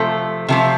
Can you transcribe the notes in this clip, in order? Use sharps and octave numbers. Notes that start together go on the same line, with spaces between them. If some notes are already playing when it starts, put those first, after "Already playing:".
Already playing: C3 F3 A3
C3 F3 A3